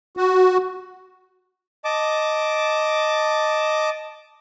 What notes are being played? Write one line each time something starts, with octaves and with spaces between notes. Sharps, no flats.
F#4
D#5 A5 D6